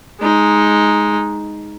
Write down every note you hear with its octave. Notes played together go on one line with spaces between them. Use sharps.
G#3 D#4